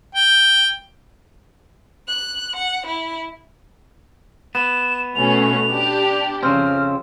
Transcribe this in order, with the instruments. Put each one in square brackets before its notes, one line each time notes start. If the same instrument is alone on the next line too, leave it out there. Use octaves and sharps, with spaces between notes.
[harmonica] G5
[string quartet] F#6
F#5
E4
[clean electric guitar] B3 [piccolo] E7
[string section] B2 A3 C#4 [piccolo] F7
[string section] D4 G4
[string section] F2 [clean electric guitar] C#3 C4 [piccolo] F6